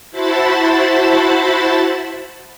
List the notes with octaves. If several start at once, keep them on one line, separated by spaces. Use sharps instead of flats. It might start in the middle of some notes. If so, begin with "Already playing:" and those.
E4 F#4 C5 A5 B5 A6